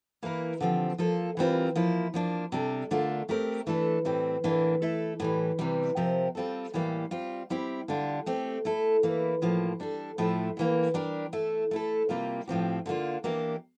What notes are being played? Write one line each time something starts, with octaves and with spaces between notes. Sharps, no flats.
E3 A#3 E4 A#4
D3 F3 C4 G4
F3 A#3 F4 A4
E3 G3 C4 F4 A#4
F3 A#3 E4
F3 A#3 D4
C3 G3 D4 A4
D3 A3 D4 F4 A#4
A3 C4 G4 A#4
E3 A3 D4 A4
A2 E3 G3 C4
A2 E3 A#3 D4
A3 E4 A4
A2 E3 G3
C3 E3 G3
C3 F3 C4 G4 A#4
G3 C4 F4 A4
A2 E3 G3 A#3
G3 C4 F4
G3 C4 E4 G4
D3 G3 D4 F4
A3 C4 G4
A3 E4 A4
E3 A#3 E4
A2 F3 A#3
G3 D4 A4
A2 F3 A3 E4
A2 E3 A#3
G3 D4 G4 A#4
A3 E4 A4
A3 E4 A4
C3 G3 A#3 F4
A2 F3 C4 G4
D3 G3 A#3 D4 F4
E3 A#3 D4 G4 A#4